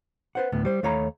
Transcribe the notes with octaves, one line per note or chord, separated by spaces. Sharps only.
B4 C5 F#5
D2 A2 B3
G3 C5
D#2 A3 C#5 F5 A#5 B5